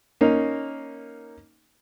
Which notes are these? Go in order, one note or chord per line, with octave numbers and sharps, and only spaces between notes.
A#3 C#4 D#4